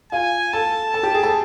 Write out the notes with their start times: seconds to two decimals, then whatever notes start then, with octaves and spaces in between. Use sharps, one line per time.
0.12 F4 G#5
0.53 A4 A5
0.94 A4
1.03 G4
1.14 G#4
1.23 A4